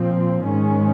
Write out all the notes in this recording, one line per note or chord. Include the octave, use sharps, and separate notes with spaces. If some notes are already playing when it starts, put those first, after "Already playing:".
Already playing: A#2 F3 C4
G#2 D#3 G#3 C#4